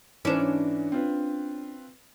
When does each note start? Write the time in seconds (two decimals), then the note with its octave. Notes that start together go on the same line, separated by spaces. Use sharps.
0.25 G#2 E3 C#4 D4
0.92 C4 F4 B4